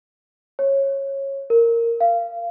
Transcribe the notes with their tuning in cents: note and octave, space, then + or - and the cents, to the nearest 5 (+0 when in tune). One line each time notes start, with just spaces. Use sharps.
C#5 -15
A#4 -10
F5 -25